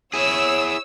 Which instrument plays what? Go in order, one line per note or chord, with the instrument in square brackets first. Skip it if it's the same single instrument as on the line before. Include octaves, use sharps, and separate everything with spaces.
[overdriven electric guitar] E4 G#4 [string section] C#5 E6